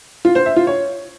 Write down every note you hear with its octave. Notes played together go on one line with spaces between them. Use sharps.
F4
C5
E5
F4
C#5